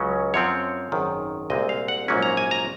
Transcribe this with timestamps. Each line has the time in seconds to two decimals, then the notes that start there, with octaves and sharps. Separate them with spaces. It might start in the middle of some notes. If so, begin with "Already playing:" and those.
Already playing: C#2 C#3 F#3 C#4
0.34 F#2 F3 C4 C#5
0.92 G#1 F#2 D#3
1.50 C2 A#2 G#3 C4 D#5
1.69 F5
1.88 F#5
2.08 A#1 G#2 F#3 A#3 C#4
2.22 A#5
2.37 G#5
2.51 A#5